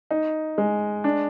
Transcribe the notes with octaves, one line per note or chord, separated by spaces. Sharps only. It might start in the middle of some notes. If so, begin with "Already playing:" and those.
D#4
G#3
D4